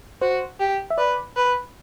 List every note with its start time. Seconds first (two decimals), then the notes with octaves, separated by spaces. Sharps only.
0.21 F#4 C5
0.60 G4
0.90 E5
0.98 B4 D5
1.36 B4